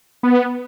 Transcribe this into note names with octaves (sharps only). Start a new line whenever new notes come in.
B3